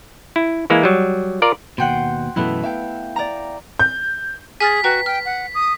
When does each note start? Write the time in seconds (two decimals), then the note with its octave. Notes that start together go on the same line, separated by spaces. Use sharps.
0.36 E4
0.70 E3 G#3 A#3 E4
0.83 F#3 G3
1.42 F4 A#4 D5
1.78 D#2 B2 F#5 G5 C6
2.36 F#2 B2 E3 A3 B3 E4
2.64 E5 F5 G5
3.16 D5 A#5
3.79 G6
4.60 G#4 G#5 F6 A6 B6
4.84 F#4 B4 G5 A#5
5.06 G5 F6
5.25 F#5
5.54 D#6